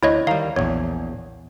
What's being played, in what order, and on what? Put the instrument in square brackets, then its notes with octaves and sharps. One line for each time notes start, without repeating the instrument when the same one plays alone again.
[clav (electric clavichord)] D2 [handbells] E4 C#5 D#5
[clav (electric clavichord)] D#3 G3 [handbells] F5 A#5
[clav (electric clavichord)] A#1 E2 [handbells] C#5